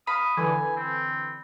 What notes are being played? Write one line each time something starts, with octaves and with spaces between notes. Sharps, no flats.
F5 B5 D#6
D3 E3 G#5
C4